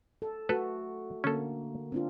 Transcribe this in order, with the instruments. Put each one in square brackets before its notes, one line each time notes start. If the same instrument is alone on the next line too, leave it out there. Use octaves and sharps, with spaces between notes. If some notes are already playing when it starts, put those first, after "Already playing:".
[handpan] A4
[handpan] A3 F#4 [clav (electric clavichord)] A4 B4
[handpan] D3 A#3 [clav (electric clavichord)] C#4 A4
[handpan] C4 D4 F4